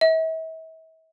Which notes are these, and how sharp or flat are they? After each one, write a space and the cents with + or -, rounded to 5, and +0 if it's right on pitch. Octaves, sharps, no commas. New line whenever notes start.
E5 -40